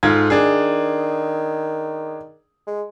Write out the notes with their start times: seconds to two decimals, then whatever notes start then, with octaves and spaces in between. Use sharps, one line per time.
0.03 G#2 F4 A4 G#6
0.30 D#3 D4 G#4
2.67 G#3